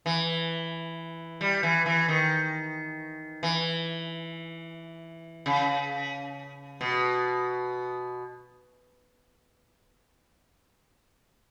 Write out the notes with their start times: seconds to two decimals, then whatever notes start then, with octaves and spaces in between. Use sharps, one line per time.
0.06 E3
1.41 G3
1.63 E3
1.86 E3
2.08 D#3
3.43 E3
5.46 C#3
6.81 B2